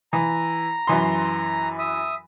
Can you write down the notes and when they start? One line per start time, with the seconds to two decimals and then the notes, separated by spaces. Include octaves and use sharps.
0.13 E3 A#5
0.87 F#2 E3 C6
1.79 E5 D#6